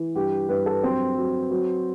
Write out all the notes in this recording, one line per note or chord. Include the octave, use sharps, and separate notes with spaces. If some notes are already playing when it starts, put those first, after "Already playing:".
Already playing: E3
G2 G4
G2 B4
A4
F#3 C4
F#3
F#3